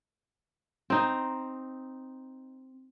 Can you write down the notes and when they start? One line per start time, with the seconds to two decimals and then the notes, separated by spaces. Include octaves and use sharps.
0.90 C4 D#4